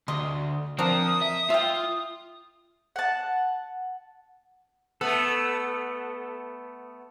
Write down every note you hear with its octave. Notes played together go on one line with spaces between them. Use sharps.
D2 G3 D#5 C6
F3 C4 D4 A#4 D#6
E5
F4 E5 G5
F#5 A5
A3 B3 A4